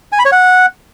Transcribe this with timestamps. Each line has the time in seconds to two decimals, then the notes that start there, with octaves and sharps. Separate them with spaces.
0.12 G#5
0.19 B5
0.25 C#5
0.32 F#5